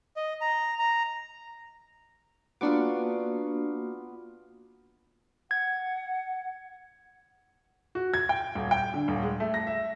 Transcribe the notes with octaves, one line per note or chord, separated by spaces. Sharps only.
D#5
A#5
A#5
A#3 B3 D4 F4 F#4 C#6 D6
F#5 G#6
F#4
G#6
G5
D#1
G5
D3
D#1
G#3
A3
A#6
E5